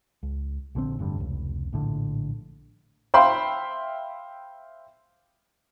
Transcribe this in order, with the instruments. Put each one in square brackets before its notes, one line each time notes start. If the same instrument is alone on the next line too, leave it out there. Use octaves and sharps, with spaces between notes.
[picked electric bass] C#2
A#1 D3 D#3 C4
F1 G2 D3 G3
F1 C#2
A#1 A2 D3
[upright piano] C5 E5 F5 G5 B5 C6